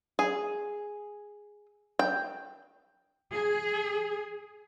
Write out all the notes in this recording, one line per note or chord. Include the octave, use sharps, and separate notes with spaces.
G#4
G5
G#4